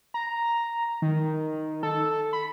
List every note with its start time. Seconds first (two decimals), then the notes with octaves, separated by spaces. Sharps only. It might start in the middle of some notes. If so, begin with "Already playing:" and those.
0.14 A#5
1.02 D#3
1.83 A4
2.33 B5